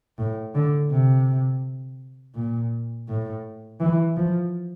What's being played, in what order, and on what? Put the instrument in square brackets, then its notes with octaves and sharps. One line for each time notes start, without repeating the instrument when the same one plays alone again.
[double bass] A2
D3
C3
A#2
A2
E3
F3